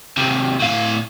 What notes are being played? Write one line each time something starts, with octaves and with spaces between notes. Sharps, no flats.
D#2 C3
A2 F5